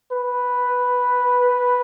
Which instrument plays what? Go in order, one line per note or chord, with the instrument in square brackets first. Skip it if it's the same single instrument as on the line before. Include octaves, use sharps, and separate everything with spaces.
[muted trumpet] B4